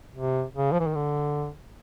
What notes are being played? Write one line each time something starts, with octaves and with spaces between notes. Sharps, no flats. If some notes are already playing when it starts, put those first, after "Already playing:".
C3
C#3
F3
E3
D#3
D3